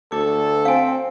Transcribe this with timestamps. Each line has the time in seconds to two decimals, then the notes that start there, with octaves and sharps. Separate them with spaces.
0.12 D2 A4 D6
0.65 C4 F5 G#5